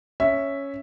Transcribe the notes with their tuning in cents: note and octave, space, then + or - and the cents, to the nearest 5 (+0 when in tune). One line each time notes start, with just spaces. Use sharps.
C#4 +0 E5 +0